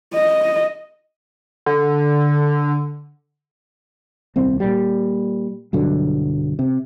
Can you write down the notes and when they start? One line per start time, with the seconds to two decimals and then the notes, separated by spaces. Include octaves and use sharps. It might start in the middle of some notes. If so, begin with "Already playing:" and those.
0.14 D#5
1.66 D3
4.36 D#1 C2 C4
4.60 A#2 G3
5.73 B1 G2 D3 F#3
6.59 C3